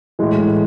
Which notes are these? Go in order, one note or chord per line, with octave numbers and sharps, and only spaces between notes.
A2 E3 G#3